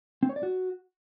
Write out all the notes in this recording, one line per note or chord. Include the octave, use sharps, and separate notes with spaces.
C4
C#5
D5
F#4